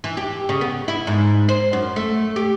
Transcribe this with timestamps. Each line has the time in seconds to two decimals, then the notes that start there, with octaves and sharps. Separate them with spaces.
0.04 E3
0.17 G4
0.49 C#3
0.61 B3
0.88 E4
1.07 G#2
1.49 C5
1.73 F#2
1.96 A3
2.36 G4